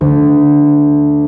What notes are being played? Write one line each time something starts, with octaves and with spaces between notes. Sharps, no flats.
D2